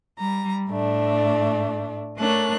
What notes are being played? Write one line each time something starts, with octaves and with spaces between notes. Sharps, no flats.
G3 A#5
A2 A3 D4
A3 D4 A#4 C#5 F#6